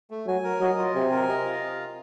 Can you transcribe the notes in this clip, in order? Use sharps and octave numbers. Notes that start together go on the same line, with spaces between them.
A3
F#3 G#5
A#4
F#3 D#5
F4
C3 G#5
A#4
D#5
F4